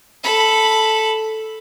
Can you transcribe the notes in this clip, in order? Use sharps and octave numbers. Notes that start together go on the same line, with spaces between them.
A4 B5